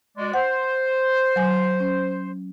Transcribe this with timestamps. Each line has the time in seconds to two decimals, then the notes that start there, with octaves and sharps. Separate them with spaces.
0.17 G#3 F#4 D5
0.34 C5 F#5
1.36 F#3 G#5
1.80 C#4